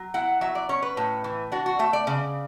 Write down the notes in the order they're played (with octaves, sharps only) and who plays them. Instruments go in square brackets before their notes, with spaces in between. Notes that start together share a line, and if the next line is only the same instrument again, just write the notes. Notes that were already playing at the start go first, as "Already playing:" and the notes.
Already playing: [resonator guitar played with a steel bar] F#3
E4 F#5
F#3 E5
D5
C#4 C#5
B4
A2
E3
D4 F#4
F#4
A3 E5
D5
C#3